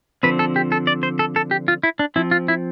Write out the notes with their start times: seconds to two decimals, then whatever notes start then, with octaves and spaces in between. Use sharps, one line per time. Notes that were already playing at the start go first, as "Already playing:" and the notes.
0.23 D3 F3 C4 B4
0.39 A4
0.56 G4
0.72 A4
0.87 D5
1.03 C5
1.19 A4
1.36 A4
1.51 G4
1.68 F4
1.83 E4
1.99 D4
2.16 F3 C4 E4
2.31 F4
2.48 E4